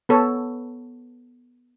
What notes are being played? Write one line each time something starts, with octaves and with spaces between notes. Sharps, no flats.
B3 A4 C#5